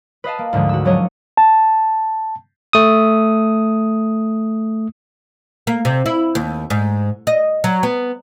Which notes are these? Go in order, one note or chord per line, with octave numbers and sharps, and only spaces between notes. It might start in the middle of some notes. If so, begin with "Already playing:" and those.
B4 D#5 F5 A5
A#3
D2 G#2 D3 F3 G#3
F#4 E6
F3 F#3 C#4 D4 C#5 D#5
A5
A3 D#6
A#3
C3
E4
D#2
G#2
D#5
F#3
B3